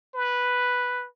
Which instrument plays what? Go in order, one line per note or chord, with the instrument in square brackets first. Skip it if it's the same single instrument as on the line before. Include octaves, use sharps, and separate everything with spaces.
[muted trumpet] B4